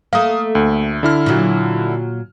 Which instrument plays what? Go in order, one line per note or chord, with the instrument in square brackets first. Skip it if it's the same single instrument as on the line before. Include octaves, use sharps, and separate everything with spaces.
[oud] A3 A#3 [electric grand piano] F5 D#6
[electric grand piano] D2
D3 E4 F6
[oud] A#2 F#3